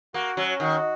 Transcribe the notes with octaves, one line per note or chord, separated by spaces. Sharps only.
A#3 F#4
F#3 C#4
D#3 F#4